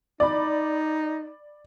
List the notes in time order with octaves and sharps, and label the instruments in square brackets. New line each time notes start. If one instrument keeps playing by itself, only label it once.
[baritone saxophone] D#4 [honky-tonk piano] D5 B5